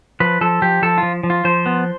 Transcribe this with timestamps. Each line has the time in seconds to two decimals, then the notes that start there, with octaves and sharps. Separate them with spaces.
0.20 F3 B4
0.41 F3 A4
0.62 F3 G4
0.82 F3 A4
0.98 F3 F4
1.23 F3
1.30 F4
1.45 F3 C5
1.66 B3